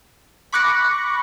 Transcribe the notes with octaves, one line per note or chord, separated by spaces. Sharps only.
B5 C#6 D6 F#6 A#6 C#7